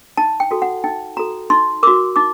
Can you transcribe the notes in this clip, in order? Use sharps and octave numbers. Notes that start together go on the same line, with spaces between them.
D#4 A5
G5
F#4 A4
F#5
D#4 G5
F#4 A4 A#5
D#4 C6
F#4 A#4 D6
D#4 D6